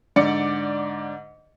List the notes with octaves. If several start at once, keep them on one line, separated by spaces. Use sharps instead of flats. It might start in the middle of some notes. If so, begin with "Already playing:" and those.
G#2 D3 D5 C#7